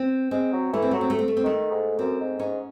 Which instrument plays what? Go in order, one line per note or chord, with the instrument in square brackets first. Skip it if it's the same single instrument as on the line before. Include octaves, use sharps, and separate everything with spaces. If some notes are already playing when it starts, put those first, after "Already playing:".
Already playing: [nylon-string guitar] C4
[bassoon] G#3 [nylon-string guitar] C4
[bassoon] F#3
[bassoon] E3 [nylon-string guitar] A3
[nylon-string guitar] C4
[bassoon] F#3 [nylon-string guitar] A3
[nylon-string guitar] C4
A3
C4
A3
C4
[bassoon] D#3 [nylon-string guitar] A3
[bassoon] G#2
[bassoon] F#2 [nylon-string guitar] C4
[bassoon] G#2
[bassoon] G#2 [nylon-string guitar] C#4